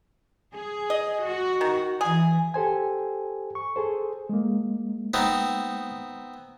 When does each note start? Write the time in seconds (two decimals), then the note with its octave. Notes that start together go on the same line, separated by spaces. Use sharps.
0.55 G#4
0.90 D#5
1.26 F#4
1.61 D#3
2.01 E3 G#4
2.54 G4 A4 C5 G#5
3.55 C#6
3.76 G#4 A4 C5
4.29 G#3 A#3
5.14 B3 C4 D#4